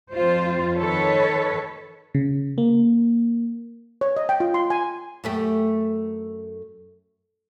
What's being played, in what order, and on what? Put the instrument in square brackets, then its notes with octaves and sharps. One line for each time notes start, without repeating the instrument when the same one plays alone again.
[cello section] F2 F4 C5
D#3 A4 B4 C#5
[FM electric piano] C#3
A#3
[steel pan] C#5
D#5
G5
F4
C6
G#5
[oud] F#2 A3 G4